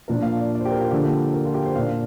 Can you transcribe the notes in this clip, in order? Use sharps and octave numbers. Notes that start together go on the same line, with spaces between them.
A#2 F3 A#3 D4 A#4
F5
D5
D5
C5
G4
A#4
F4
D3 F3 A#3 D4 G4
A#4
F4
G4
C5
A#2 A#3 D4 F5